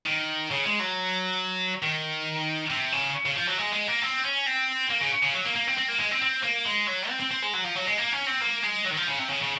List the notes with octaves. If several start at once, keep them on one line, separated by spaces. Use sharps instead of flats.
D#3
C#3
G#3
F#3
D#3
C3
C#3
C#3
F3
F#3
G#3
G#3
A#3
C4
C#4
C4
A#3
C#3
C#3
F#3
A#3
A#3
C4
C4
A#3
G#3
C4
C4
A#3
G#3
F#3
C4
C4
C4
G#3
F#3
F3
F#3
G#3
A#3
C#4
C4
A#3
G#3
F#3
D#3
F3
C#3
C3
C#3
C#3